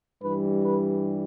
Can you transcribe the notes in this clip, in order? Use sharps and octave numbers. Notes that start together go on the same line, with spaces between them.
G2 E3 G3 B4
B4